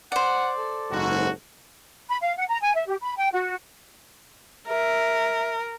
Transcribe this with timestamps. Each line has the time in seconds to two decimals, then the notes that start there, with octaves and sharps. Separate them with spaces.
0.12 C5 D5 F#5
0.57 A4
0.91 F#1 G#2 F#4
2.09 B5
2.21 F5
2.37 F#5
2.49 A#5
2.62 G#5
2.75 E5
2.88 G4
3.01 B5
3.18 G5
3.33 F#4
4.68 A#4 E5